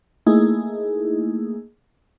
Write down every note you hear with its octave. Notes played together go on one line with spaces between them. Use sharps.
A3 A#3 D#4 E4 G#4